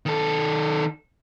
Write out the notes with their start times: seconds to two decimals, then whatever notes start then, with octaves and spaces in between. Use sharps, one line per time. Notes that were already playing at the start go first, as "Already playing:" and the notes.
0.06 D#3 A4